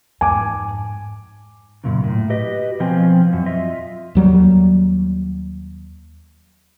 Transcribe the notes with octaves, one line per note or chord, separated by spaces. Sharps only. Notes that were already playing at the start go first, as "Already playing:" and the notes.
F2 G#2 G#5 D6
F#2 A#2 C#3
A2
F#4 G4 B4 D#5
B2 F3 C4 G5 G#5
F#2
F4 D#5 E5
D#2 F#3 G3